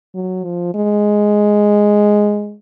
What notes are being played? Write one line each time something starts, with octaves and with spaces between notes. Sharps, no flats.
F#3
F3
G#3